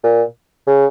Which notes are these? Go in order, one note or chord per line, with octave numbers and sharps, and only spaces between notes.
A#2
C#3